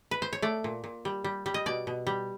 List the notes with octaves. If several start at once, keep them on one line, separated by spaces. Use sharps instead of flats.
B4
C5
C#5
A3 D5
A#2
A#2
G3
G3
G3
D#5
B2 D5
B2
G3